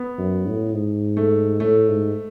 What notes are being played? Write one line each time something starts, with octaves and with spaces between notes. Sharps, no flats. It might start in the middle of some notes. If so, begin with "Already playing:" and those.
Already playing: B3
F#2
A2
G#2
A3
A2 A3
G#2